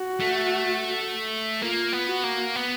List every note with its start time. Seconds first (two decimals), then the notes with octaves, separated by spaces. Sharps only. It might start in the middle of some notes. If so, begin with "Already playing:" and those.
Already playing: F#4
0.21 A3
1.61 A#3 F4
1.93 B3
2.08 F#4
2.24 A#3
2.56 B3